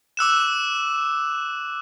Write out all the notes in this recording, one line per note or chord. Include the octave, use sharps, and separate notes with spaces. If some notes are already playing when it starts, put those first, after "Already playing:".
D6 E6 F#6 E7